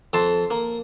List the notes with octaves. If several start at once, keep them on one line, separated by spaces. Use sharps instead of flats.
F2 A5 C6
A#3